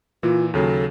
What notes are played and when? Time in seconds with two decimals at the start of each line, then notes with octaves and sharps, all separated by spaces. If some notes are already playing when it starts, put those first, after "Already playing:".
0.23 A#2 E3 F4
0.54 D#2 C#3 F#3 A4